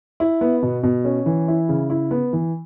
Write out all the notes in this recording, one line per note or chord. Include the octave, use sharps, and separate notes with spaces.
E4
B3
B2
B2
C#4
E3
E4
C#3
E4
B3
E3